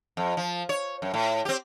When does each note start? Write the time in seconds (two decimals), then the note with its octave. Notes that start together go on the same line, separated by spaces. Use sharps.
0.17 F2
0.37 F3
0.69 C#5
1.02 F#2
1.14 A2
1.45 C4 G4